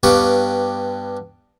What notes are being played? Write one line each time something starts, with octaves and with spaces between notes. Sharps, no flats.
G2 B3 G4 F5 C#6 D6